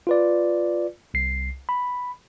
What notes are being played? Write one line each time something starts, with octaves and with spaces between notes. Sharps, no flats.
F4 B4 D5
C2 C7
B5